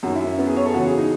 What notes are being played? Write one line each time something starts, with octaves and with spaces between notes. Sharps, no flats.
F#2 D#3 F#4
E4
C#4
B3
G#4
C#5
A4
E2 C#3 E3 F#4
G#4
D#4